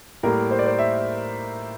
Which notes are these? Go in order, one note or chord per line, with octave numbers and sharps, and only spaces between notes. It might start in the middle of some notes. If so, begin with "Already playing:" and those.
A2 G3 A#3 A#4
C5
D5
C5
E5